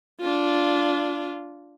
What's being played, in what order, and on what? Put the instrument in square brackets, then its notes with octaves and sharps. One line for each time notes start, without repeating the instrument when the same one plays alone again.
[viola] D4 F4